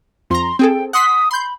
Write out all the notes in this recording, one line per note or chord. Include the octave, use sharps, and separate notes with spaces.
F2 A#5 C6
C4 G#4 A4 G5
F#5 C6 D#6 B6
B5 C6 G6